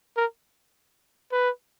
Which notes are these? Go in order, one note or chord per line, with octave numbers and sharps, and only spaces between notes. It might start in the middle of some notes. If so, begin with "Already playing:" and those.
A#4
B4